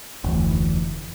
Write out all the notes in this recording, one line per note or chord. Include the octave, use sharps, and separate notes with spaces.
F1 D2 E3